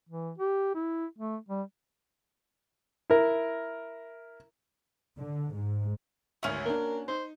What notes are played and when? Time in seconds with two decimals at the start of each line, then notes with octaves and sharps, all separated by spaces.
0.09 E3
0.38 G4
0.75 E4
1.19 A3
1.49 G3
3.10 E4 A#4
5.18 D3
5.54 G#2
6.43 G#1 D2 C#4 F#4 E5
6.66 A#3 D4 A#4
7.08 D#4 C5